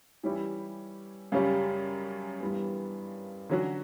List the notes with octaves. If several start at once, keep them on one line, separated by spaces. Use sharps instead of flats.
E3 G3 C#4 E4 G4
F#2 C#3 G3 C#4 G4
G2 E3 G3 B3
D3 F#3 C#4 F#4